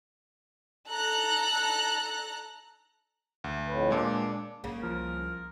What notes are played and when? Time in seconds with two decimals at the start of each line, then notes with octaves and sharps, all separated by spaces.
0.89 A4 A#5 F#6
3.44 D2
3.68 F2 A2 B4
3.90 A#2 G#3 D4
4.64 B1 C#3 A#3 C#4
4.83 C2 F3 A#4